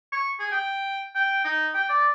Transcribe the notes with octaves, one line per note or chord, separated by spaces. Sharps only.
C#6
G#4
G5
G5
D#4
G5
D5